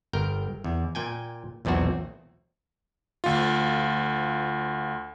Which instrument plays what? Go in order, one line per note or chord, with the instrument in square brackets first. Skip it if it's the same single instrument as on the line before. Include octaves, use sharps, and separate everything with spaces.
[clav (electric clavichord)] G1 A#4 G5
E2
A#2 G5 G#5
B1 E2 A#2 C4 F#4
[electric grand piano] D2 F4